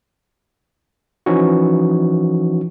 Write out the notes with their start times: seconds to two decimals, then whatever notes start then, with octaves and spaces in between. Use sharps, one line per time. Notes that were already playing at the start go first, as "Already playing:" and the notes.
1.26 E3 F3 C#4 D#4 F#4